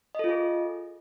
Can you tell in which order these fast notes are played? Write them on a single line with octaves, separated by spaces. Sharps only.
D#5 A4 F4 G#4